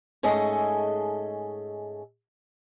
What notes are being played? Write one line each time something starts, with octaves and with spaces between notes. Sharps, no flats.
G#2 A3 C#4 G#4 A4 D#5